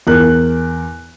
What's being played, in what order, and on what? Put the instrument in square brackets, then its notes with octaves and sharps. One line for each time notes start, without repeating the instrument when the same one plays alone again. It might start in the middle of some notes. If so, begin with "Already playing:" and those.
[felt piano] E2 A#4 F#6